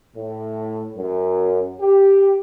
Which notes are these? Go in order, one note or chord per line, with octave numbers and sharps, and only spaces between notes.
A2
F#2
G4